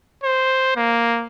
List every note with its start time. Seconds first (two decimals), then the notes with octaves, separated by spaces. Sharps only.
0.24 C5
0.76 A#3